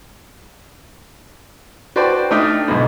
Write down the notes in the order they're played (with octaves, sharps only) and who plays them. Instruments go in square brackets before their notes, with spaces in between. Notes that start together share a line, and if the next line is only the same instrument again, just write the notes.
[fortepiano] F#4 B4 C5 D5 G5 A5
A3 D4 D#4 G5 D#6 F6
B1 G#2 B2